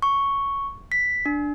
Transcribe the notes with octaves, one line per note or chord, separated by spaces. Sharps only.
C#6
B6
D4